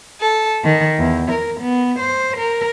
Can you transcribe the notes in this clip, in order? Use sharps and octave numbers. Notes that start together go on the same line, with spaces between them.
A4
D#3
E2
A#4
B3
C5
A#4